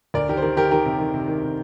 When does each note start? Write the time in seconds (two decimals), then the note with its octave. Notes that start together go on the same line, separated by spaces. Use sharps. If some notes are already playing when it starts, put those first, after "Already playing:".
0.14 D2 A#4 D5
0.29 D#3 G4 A#4
0.37 C5
0.42 D#3 G4 A#4
0.57 D#3 G4 A#4
0.71 D#3 G4 A#4
0.85 C3
0.99 D#3
1.14 C3
1.28 D#3
1.43 C3